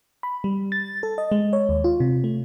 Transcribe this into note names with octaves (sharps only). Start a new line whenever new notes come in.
B5
G3
A6
A4
D#5
G#3
C#5
D#2
F4
C3
A3